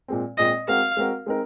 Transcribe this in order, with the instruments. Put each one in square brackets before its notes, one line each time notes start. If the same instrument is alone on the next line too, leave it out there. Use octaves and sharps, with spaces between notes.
[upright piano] A#2 G#3 C4
[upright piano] A#2 G#3 C4 [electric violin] D#5
[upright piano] G#3 C4 F#4 A#4 [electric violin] F5
[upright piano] G#3 C4 F#4 A#4
G#3 C4 D#4 A#4